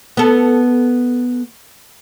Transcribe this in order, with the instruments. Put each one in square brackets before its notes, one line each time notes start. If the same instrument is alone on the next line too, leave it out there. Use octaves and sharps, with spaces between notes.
[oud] B3 A4